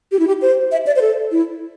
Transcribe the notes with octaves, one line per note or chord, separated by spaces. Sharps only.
G4
E4
G4
C5
E5
D5
C5
A4
E4